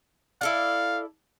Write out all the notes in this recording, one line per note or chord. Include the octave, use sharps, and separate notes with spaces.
E4 A4 D5 F5